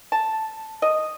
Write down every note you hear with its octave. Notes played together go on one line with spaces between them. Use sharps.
A5
D#5